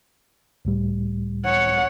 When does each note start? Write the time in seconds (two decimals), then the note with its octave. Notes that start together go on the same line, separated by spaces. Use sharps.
0.65 C#2 A2 G3
1.46 C#5 F#5